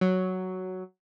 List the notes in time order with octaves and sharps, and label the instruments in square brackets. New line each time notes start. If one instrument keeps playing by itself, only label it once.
[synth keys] F#3